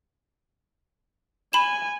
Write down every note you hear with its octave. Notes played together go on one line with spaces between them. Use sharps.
G#5 B5 E7